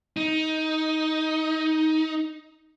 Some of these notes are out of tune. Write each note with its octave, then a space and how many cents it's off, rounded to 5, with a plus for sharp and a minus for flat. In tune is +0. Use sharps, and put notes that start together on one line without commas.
D#4 +15